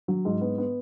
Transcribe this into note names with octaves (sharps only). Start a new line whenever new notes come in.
F#3
G#2
B3
B3